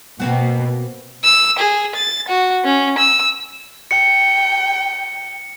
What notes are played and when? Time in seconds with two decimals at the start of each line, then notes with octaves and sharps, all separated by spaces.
0.20 B2 A#3 C4 F#4
1.24 E6
1.59 G#4
1.95 A6
2.28 F#4
2.65 C#4
2.98 E6
3.91 G5 C#7